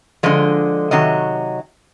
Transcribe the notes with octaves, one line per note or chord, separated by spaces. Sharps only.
D3 F3 G#3 D#5
C3 D#3 F#3 D#5